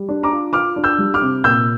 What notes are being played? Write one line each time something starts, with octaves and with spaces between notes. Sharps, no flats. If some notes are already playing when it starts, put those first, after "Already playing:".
Already playing: G3
D4
A#5 D6
F4
F4 D6 F6
D4
E6 G6
G3
D6 F6
C3
A#2 E6 G6